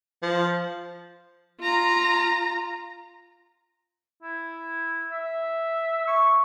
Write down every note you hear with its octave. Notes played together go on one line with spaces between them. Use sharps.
F3
F4 A#5
E4
E5
C#6